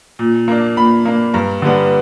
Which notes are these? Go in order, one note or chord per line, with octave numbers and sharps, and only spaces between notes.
A#2
A#3 D4
A#2 B5
A#3 D4
G2 A#5
D3 G3 B3 D4